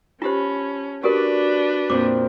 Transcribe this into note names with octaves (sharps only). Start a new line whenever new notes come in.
C#4 F4 G4 C5 A5 B5
D4 F#4 G4 A#4 B4 D5
F2 A#2 C4 D6